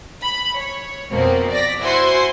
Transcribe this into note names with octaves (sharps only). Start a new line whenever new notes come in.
B5
C#5
F2 B2 A#3 C4
D5 A#6 B6
E4 F#4 C5 G#5 C6